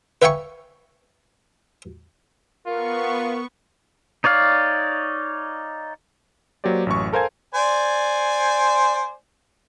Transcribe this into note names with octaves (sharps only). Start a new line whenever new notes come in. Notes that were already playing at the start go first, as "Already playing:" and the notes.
B4 E5 F5 G5 G#5 C#6
B3 F4 A#4 C#6
D#4 C#5 D5 F5
F#3 A#3 G4 C5 D5
A1 F#2 C#6
A4 A#4 C5 F5 G#5 G#6
C5 D5 G#5